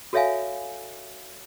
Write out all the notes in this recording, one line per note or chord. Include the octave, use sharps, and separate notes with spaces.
F#4 A4 C#5 E5 F5 G#5